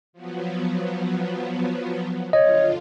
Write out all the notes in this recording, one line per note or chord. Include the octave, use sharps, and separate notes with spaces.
F3 F#3 B3
D3 F4 C#5 D#5